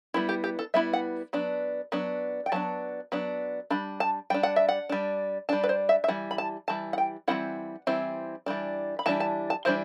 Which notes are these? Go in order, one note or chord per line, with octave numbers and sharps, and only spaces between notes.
G3 B3 E4
G4
G4
A4
G3 B3 E4 E5
F#5
F#3 B3 D4
F#3 B3 D4
G5
F#3 B3 D4 A5
F#3 B3 D4
G3 D4 B5
A5
G3 D4 G5
F#5
E5
F#5
G3 D4
G3 D4 A5
B4
C5
E5
E5
E3 G3 F#5
B5
A5
E3 G3 A5
F#5
G5
E3 G3 C4 E4 F#5
E3 G3 C4 E4
E3 G3 D4
B5
E3 G3 D4 A5
A5
A5
E3 G3 D4 C5